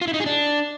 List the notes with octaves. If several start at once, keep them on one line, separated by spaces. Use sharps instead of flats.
F4
E4
D#4
G#4
D4